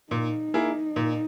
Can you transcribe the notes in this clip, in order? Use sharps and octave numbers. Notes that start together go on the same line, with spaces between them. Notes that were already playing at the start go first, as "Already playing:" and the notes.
A#2 D#4
A#3 E4 G#4
A#2